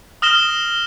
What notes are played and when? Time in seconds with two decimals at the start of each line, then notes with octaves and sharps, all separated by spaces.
0.22 D#6 F6 A#6 E7 G7